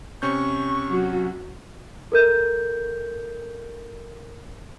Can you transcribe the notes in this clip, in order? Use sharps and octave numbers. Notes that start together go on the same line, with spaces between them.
C3 C#4 C#6 G6
F#3 F#4
A4 A#4 G6